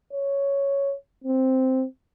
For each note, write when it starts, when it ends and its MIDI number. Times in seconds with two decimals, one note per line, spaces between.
0.13 0.94 73
1.24 1.86 60